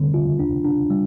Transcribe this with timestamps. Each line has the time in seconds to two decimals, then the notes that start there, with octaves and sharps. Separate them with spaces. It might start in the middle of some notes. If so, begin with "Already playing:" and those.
Already playing: D3 G3 C4
0.14 F4
0.39 D4
0.64 D4
0.90 G3